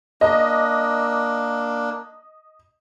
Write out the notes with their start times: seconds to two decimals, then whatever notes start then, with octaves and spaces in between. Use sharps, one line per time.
0.21 A#3 D4 D#5